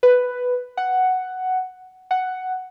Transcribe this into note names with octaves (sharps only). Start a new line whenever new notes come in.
B4
F#5
F#5